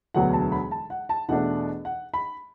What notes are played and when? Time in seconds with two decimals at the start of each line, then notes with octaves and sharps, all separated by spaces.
0.14 E1 D2 D3 F#3 B3 F#5
0.33 A5
0.52 B5
0.71 A5
0.90 F#5
1.09 A5
1.28 E2 B2 A3 D4 F#5
1.85 F#5
2.14 B5